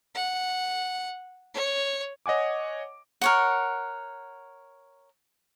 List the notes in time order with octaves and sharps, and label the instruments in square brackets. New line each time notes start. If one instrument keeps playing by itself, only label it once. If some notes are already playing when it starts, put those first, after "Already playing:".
[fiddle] F#5
C#5
[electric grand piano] C#5 D#5 F#5 G#5 D6
[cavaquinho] A#4 C#5 F#5